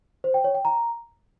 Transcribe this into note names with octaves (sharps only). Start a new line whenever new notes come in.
C5
G5
C#5
G5
A#5